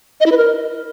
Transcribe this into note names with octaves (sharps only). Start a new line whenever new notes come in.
D#5
E4
B4
A#4